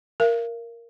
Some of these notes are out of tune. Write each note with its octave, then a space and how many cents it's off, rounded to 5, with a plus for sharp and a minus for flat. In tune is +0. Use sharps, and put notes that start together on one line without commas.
A#4 +0 F5 -40